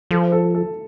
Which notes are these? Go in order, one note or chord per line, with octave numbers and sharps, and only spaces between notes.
F3 A4
A4
A4